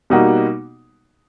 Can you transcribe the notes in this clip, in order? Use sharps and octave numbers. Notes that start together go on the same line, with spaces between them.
B2 G3 A#3 D#4 F#4